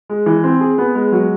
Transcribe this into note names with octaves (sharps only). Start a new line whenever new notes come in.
G#3
E3
C4
G#4
B3
G#3
F#3